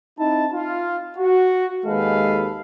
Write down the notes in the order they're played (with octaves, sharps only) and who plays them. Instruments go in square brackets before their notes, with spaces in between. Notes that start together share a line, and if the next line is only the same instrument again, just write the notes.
[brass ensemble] C4 D#4 E4 A5
F4
F#4
D#2 G#3 A4 B4 F5